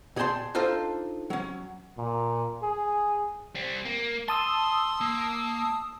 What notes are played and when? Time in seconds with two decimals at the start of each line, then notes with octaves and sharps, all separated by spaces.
0.16 A#2 G#4 D5 G5 A5 C6
0.55 D4 D#4 F4 A4 C5
1.30 F#3 C#4
1.98 A#2
2.63 G#4
3.55 G3 C4
3.85 A#3
4.28 A5 C6 D#6 E6
5.01 A#3